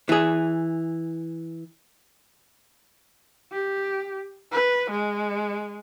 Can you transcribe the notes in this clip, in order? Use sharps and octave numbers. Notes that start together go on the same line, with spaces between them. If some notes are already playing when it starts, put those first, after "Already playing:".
E3 G#4
G4
B4
G#3